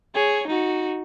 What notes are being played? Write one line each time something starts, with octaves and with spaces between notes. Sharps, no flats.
G#4 C#5
D#4 F#4